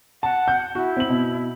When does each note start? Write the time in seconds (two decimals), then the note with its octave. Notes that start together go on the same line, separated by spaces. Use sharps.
0.23 F#5 A5
0.48 G6
0.75 E4 F#4
0.97 C4 F#7
1.09 B2